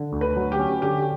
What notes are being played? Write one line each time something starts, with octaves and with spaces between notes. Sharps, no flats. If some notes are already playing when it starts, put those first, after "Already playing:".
Already playing: D3
D2
B4
F#3
G4
C#4
D3 G4